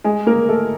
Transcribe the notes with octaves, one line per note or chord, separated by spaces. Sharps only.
G#3 G#4
A#3 A#4
A3 A4